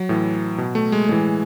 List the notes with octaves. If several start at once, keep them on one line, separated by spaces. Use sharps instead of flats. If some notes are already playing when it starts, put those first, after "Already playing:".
Already playing: F#3
A2 E3
B2
A3
G#3
A2 E3 G#3